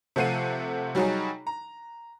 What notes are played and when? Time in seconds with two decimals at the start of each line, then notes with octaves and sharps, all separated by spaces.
0.16 C3 F3 A3 F#5 C7 D#7
0.95 F#3 G3 D#4 F#4 G#4 C#5
1.47 A#5